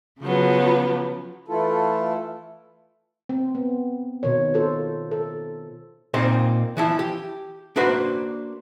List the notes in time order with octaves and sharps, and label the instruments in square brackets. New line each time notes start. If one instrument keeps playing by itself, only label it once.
[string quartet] C#3 F3 F#3 B3
[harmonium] E3 A3 E4 F4 A4
[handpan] C4
B3
B2 D#3 C#5
F4 A4 C5
A4
[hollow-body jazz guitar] A#2 A#3 C4 D#4 C5
E3 F3 E4
G4
A#3 D4 F#4 B4 C5